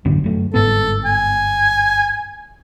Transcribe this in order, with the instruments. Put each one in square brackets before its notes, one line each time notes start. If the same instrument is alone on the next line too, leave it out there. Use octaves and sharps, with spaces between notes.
[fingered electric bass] A1 F#2 D3
F#2 A3
[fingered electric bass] G1 G#2 B3 [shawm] A4
[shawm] G#5